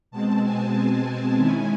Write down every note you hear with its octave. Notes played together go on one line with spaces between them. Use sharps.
B2 G#3 C4 A5
G#5
D#3 G#3 C#4 E4 G#5